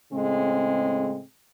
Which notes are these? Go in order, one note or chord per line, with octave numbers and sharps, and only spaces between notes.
A2 C#3 G#3 C4